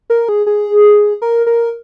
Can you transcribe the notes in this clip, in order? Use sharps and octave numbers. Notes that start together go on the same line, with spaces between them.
A#4
G#4
G#4
A#4
A#4